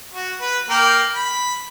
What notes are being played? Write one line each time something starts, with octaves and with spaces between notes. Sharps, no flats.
F#4
B4
A#3 A#4 G5
B5